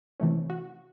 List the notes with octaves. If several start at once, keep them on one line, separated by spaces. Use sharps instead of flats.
C3 E3 A3 C#4
F#4